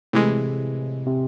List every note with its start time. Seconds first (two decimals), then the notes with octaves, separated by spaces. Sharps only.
0.13 A2 C3 E3 G#3
1.06 C3